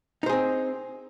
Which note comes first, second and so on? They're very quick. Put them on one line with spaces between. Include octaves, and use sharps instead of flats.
D#4 C5 G#4 C4